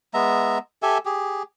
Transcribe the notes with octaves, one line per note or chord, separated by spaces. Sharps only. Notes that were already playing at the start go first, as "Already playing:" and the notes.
G#3 B3 E5 A#5
G4 A4 E5 G#5
G4 G#4